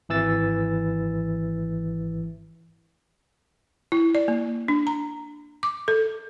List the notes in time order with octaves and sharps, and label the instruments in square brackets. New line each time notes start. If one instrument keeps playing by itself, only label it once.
[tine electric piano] G#1 E3 E6 A6
[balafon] E4
D5
A#3
D4
A#5
D6
A4